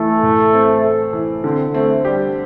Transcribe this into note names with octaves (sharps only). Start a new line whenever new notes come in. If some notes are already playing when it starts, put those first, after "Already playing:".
Already playing: E3 A3
A2
C4
A4
E3
D3 C4
A3 C4
G3 G4